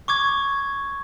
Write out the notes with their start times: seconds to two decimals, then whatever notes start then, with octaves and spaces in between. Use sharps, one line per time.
0.08 C#6 D6 G#6